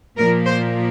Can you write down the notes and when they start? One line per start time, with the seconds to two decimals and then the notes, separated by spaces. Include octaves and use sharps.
0.17 A#2 F3 A#3 A#4
0.46 C5